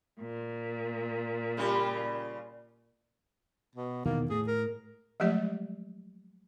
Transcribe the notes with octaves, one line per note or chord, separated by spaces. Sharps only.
A#2
C#3 G3 F4
B2
E2 B2 D#3 A#3
A2 G#4
A#4
F3 F#3 G#3 A3 G4 D5